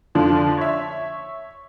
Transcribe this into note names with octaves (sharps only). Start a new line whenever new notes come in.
F2 D3 F3 D4
C#5 E5